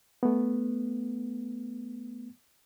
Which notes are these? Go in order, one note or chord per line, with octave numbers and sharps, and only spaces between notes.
A3 B3